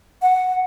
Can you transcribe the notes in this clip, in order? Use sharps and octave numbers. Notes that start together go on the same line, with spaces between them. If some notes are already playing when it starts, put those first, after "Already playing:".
F#5